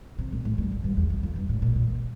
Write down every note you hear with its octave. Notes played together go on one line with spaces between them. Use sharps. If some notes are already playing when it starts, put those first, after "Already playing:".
C3
A#2
A2
G2
F2
G2
E2
F2
F2
G2
A2
A#2
A#2